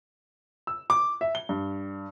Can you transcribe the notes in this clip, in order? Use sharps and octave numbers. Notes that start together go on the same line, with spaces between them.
E6
D6
E5
G7
G2